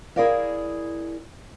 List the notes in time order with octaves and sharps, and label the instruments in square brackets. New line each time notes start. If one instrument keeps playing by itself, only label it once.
[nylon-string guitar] E4 G#4 A#4 D5 D#5 F5